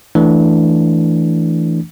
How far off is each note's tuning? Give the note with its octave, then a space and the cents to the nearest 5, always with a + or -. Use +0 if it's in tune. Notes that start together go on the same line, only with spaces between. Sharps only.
E3 +0 A3 +0 D4 -10